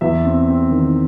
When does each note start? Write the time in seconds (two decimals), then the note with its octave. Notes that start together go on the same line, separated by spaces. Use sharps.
0.01 E2 E5
0.25 C4
0.48 C4
0.71 D#3